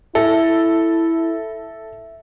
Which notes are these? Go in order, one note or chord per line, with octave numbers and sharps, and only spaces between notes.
E4 A4 E5